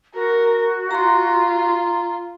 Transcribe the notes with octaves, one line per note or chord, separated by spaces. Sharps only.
F#4 A#4
F4 A#5 C6